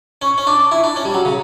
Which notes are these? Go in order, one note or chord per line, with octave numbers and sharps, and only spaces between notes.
C#4 C#6
C#4
D4 D6
E4
D4
C#4
G3
F#3
C#3